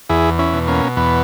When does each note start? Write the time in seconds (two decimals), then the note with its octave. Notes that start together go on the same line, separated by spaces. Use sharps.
0.09 E2 E4 G#4
0.39 C#4 E4
0.53 B2
0.68 A#3 C#4
0.97 E2 B3